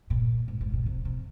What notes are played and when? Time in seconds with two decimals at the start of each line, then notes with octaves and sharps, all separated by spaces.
0.10 A#2
0.48 G#2
0.61 G#2
0.73 A#2
0.86 C3
1.05 C3